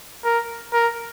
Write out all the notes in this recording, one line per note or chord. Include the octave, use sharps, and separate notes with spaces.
A#4
A#4